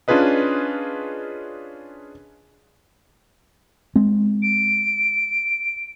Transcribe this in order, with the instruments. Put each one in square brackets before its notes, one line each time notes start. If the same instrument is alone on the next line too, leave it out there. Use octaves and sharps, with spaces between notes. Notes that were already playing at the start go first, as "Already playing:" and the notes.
[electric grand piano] C#4 D4 F4 G#4 B4 D#5
[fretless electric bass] G#3 C4
[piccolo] D7